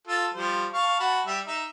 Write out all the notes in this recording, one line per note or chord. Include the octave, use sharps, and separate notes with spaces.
F4 A4
F3 G3 C5
F5 A5 C#6
F#4 A5 B5
G3 E5
D#4 E5